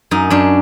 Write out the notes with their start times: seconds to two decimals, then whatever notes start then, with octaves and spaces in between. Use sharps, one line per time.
0.11 F#2 D#4
0.30 F#2 D4